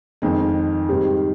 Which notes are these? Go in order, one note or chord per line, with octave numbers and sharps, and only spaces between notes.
F2 D#3 G#3
G#2 D#3 G3 C4 G4